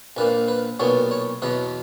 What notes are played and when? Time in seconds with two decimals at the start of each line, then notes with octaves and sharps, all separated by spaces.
0.17 A#1 A#2 A#3 B4
0.48 B4
0.79 B1 A#2 F#3 B3 C#5
1.11 C#5
1.42 E2 B2 F#3 B4